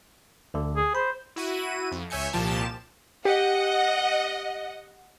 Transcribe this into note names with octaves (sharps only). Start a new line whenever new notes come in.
D2 D3
G#4
C5 B5
E4 F#4 D#7
F2
C#2 C#5 E5 G#5 G6 C#7
C2 A#2 F3 G4 A5 E7
G4 D#5 F#5